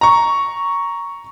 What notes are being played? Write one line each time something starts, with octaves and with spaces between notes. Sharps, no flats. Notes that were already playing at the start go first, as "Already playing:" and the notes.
A#5 C#6